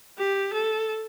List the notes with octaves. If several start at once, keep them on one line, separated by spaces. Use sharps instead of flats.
G4
A4